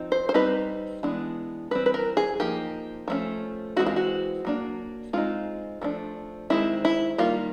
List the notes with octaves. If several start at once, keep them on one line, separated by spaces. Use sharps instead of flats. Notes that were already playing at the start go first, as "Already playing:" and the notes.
Already playing: F3 C4 D#4
C5
C5
G3 C4 D#4 B4
E3 G#3 B3 D4
E3 G3 C4 B4
B4
A#4
G#4
F3 A#3 D#4 G4
F3 A3 C#4
E3 G#3 C4 F#4
F4
F#4
F#3 A#3 D4
G#3 C4 D#4 F4
F3 A3 D4
D#3 G#3 C4 E4
E4
D#3 G3 A#3 F4